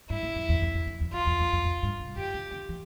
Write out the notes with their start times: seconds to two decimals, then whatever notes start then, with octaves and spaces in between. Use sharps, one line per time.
0.10 G2 E4
0.23 G2
0.35 F2
0.49 E2
0.62 F2
0.75 F2
0.87 F2
1.01 E2
1.13 E2 F4
1.26 E2
1.40 F2
1.52 F2
1.65 F2
1.83 G2
2.00 C3
2.17 D3 G4
2.34 D3
2.51 D3
2.69 E3